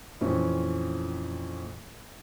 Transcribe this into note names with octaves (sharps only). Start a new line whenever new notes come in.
F2 A#2 E3 C4 C#4